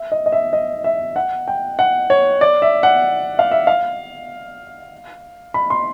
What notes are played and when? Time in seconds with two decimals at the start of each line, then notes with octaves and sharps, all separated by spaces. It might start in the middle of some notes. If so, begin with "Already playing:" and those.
Already playing: E5
0.12 D#5
0.26 D#5
0.32 E5
0.53 D#5
0.84 E5
1.16 F#5
1.48 G5
1.79 F#5
2.10 C#5
2.41 D5
2.62 E5
2.83 F#5
3.39 F5
3.51 E5
3.67 F5
5.54 B5
5.70 C6